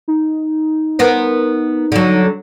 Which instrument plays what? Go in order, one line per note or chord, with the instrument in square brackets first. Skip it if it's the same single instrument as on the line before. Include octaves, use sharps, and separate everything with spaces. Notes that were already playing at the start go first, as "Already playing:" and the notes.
[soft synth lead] D#4
[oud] B3 A#4 C5
D3 F#3